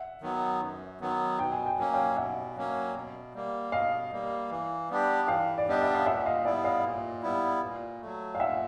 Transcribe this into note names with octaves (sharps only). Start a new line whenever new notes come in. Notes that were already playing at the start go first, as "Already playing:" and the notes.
Already playing: E5 F#5
D#3 F#3 B3
F#2
D#3 F#3 B3
B2 G5
G#5
G5
F#3 A#3 C#4 G#5
F5 G5
B2 E5 F#5
F#3 A#3 C#4
B2
G3 A#3
B2 D#5 F5
G3 A#3
E3
G3 B3 D4 G4
E3 F5 G5
D5
G3 B3 D4 G4 D#5
E5
F5
A#2 E5 F#5
D#5 F5
G3 B3 E4 D5 E5
D#5 F5
A#2
G3 B3 E4
A#2
F#3 A3
F5
A#2 E5 F#5